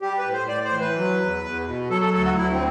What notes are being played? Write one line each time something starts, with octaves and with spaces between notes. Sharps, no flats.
G3 G4
B4
A2
C5
A2 D5
C5
E3
B4
F#3
E2
E2
B2
F#3 A4
A4
D2 A4
F#4
D2 E4
C4